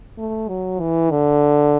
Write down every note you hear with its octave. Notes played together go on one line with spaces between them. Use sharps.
A3
F#3
E3
D3